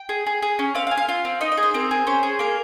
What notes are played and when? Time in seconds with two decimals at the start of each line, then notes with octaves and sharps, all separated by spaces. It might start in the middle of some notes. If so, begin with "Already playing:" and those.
Already playing: G5
0.09 G#4
0.26 G#4
0.42 G#4
0.59 C#4
0.75 C4 F5
0.87 F5
0.91 G#4
0.97 F5
1.09 F4 F5
1.25 C4
1.41 D#4 D#5
1.52 D#5
1.57 G#4
1.63 C5
1.74 C4 A#4
1.91 G#4
2.07 C#4 C5
2.23 G#4
2.39 A#3 A#4